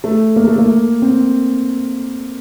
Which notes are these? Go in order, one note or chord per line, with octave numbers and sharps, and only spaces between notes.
A3
A#3
A3
A#3
C4